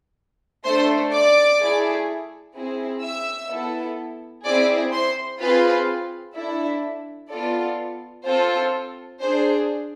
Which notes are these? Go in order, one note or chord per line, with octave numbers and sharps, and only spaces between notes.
A3 D4 A4 C5 C6
D5 D6
A3 E4 G#4
C4 E4 G#4
E5 E6
B3 E4 A4
C4 E4 G#4 D5 D6
C5 C6
C4 F4 G#4 B4 B5
D4 E4 A4 E5
B3 F4 A4 D5
C4 F4 A4 C5
D4 G#4 C5